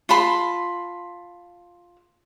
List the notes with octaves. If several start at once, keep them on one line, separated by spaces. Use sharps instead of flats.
F4 A5 B5 C6